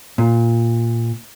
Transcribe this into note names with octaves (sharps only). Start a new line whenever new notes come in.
A#2